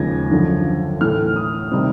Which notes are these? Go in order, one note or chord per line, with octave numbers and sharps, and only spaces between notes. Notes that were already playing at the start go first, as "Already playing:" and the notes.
Already playing: D#2 C#3 F3 G#3 G#6 A#6
F#2 D3 F3
A2 E3 A3 F6
D#6
C3 D#3 G3 C4